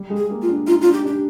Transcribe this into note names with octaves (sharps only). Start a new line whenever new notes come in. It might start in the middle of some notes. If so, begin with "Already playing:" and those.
Already playing: G3
G#3
G#4
A#3
F4
D4
D#4 F4
D4 F4
G4
D4 G4